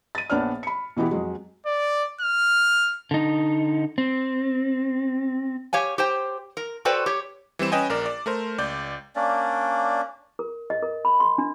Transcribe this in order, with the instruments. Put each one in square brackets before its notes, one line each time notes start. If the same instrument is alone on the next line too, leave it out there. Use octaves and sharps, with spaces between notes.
[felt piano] A6 D#7
A#1 B3 D4 C#5 D5 F6
B5 C#7
B2 E3 B3 E4 G4
F2 F#3 G#3
[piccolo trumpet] D5
F6
[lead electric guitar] D3 D#4
C4
[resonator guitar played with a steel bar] G4 C#5 F5 G#5
G4 C5 G5
A#4
F#4 A4 B4 C5 D5 G5
G4 C#5
[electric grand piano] E3 G3 C4 E7
C#4 B4 D#5 G5 G#5
A#1 A#4 D5
D5
A3 A#4 C5
C#2 D5 G6
[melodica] A#3 C#4 D4 D5
[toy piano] A#4
D#5
A#4
B5
C6
D4